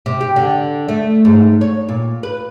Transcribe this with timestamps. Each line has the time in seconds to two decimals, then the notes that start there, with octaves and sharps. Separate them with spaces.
0.06 C3
0.21 G4
0.36 D3
0.89 A3
1.25 G#2
1.61 C#5
1.89 A#2
2.23 B4